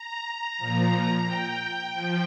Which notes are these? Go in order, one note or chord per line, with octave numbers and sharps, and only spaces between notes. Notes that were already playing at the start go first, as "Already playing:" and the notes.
Already playing: A#5
A#2 F3
G5
F3